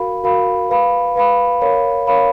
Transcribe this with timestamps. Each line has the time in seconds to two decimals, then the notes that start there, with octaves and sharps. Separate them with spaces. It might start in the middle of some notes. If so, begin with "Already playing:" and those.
Already playing: F#4 A#4 F5 B5
0.24 F#4 A#4 F5 B5
0.69 B4 F5 B5
1.16 B4 F5 B5
1.61 A#4 C#5 F5 B5
2.07 A#4 C#5 F5 B5